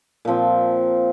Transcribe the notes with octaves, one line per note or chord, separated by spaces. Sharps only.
A#2 F3 C4